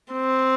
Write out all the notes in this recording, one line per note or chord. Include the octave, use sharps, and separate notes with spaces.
C4